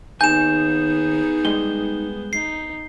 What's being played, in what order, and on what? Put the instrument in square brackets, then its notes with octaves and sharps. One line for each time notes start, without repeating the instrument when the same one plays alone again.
[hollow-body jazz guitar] D#2 G#5 [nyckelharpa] B3 G#4 [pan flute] D#4 [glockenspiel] G6 E7
[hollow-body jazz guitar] G3 G#3 [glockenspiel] G7
[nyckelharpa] D#4 [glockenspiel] C7